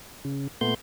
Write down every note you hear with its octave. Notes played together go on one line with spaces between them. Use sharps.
C#3
A#2 A3 B3 C6 G6